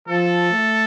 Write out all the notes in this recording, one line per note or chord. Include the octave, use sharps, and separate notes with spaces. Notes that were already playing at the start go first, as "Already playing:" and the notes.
F3 A4
A3